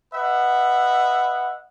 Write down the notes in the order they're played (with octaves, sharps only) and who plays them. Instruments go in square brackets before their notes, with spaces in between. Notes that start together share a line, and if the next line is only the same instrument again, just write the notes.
[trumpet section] B4 D#5 E5 F#5